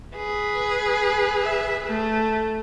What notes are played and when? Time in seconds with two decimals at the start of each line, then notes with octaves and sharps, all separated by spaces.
0.16 G#4 B4
1.43 E5
1.87 A3